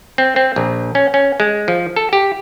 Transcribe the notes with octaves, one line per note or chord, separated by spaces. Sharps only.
C4
C4
A#1
C#4
C#4
G#3
F3
A4
G4